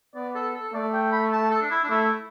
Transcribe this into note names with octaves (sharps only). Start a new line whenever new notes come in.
B3 D5
A4
A4
A3 D5
G5
B5
A5
A4
D4
E4
D4
A3 E4